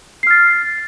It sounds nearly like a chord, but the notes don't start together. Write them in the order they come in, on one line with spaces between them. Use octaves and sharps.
C7 F6 A6